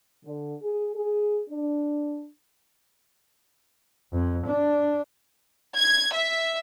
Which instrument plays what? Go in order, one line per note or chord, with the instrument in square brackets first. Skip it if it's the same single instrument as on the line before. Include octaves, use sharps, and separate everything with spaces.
[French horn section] D3
G#4
G#4
D4
[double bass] F2
D4
[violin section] G#6
E5